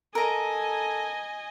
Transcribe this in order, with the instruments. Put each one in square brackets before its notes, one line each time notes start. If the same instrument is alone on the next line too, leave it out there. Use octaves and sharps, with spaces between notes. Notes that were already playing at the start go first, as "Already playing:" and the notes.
[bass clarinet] A4 [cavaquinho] A#4 A#5 [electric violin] D#5 G#5